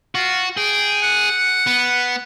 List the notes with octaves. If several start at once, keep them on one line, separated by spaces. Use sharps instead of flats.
F4 F#4
G#4 G5
F#5
B3